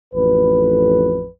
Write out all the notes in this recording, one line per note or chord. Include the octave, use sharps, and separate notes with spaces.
A1 F2 B4